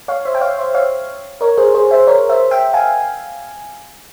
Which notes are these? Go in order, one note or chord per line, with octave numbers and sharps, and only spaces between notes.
C#5 F5
C5 E5
G5
C#5 F5
C5 E5
C#5 F5
A#4 C#5
G#4 C5
G#4 C5
C5 E5
A#4 C#5
C5 E5
E5 G5
F5 G#5